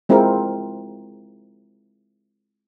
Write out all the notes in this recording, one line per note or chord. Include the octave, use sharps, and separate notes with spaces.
G#3 C4 E4 F4 A#4